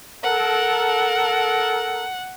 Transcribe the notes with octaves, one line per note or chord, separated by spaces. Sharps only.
A4 A#4 F#5